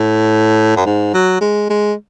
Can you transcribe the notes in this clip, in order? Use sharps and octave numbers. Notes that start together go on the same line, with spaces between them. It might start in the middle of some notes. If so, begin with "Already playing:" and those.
Already playing: A2
F#2
G#2
F#3
G#3
G#3